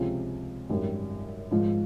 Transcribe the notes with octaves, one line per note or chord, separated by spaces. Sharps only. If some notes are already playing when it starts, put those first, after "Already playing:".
Already playing: C#2 C3 F3 G#3 C#4
G#1 F#2 D#3 G3
G#1 G#2 F3